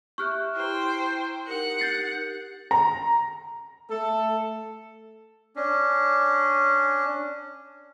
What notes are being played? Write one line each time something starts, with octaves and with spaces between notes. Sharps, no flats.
G4 E5 C#6 F6 F#6
E4 C5 G5 A#5
D#4 G4 A#4 F#5
G6 A6 C7
A#5
A3 A4
C#4 D4